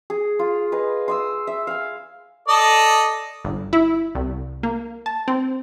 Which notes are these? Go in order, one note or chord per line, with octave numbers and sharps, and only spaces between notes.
G#4
F4
B4 D#5 G#5
C6 D#6 E6
E5
F5 G#5
A4 D5 D#5
G1
E4
C2
A#3
A5
C4